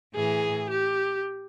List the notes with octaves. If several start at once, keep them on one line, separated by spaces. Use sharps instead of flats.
A2 E3 G#4
G4